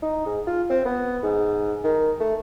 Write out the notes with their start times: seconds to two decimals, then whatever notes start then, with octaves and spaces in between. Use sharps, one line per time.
0.02 D#4
0.26 G#2
0.47 F4
0.70 C4
0.85 B3
1.23 G#2
1.84 D#3
2.20 A3